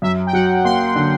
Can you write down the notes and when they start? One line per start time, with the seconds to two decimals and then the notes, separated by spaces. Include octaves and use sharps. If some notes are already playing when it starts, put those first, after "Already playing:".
0.02 F#2 E5
0.26 G5
0.33 F#3 F#5
0.64 A#3 C6
0.86 C6
0.96 D3